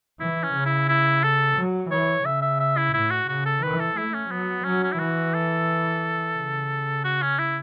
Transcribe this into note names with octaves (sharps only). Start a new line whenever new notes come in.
E3 E4
C#4
C#3
E4
E4
A4
F#3
E3 C#5
C#3 E5
E5
E5
E4
A2 E4
F#4
C#3 F#4
A4
E3 B4
A4
A3 E4
C#4
F#3 B3
F#3 C#4
C#4
E4
E3 F#4
A4
C#3
F#4
C#4
E4